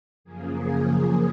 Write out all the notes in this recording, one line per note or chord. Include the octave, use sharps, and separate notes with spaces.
F#2 C#3 F3 A#3 G#4